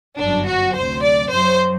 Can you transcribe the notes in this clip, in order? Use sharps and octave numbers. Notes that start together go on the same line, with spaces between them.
G1 F#2 F#3 D4
F#4
D2 C3 F#3 C5
D5
F#2 F#3 C5